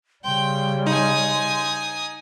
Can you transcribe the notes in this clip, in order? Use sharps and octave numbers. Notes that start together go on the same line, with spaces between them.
C#3 G3 G5 C6
D#4 G#5 D#6